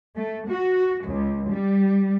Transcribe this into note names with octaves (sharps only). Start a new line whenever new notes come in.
A3
F#4
C#2
G3